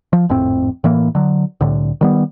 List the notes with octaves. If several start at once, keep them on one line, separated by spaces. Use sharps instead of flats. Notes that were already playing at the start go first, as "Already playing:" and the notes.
F3
G#1 F2 A2 C4
A2 E3 A#3
D3 F#3
C2 A2 D3
D#3 G3 B3